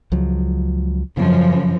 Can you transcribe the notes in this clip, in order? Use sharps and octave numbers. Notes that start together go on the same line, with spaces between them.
C#2 F3 F#3
F#2 C#3 F3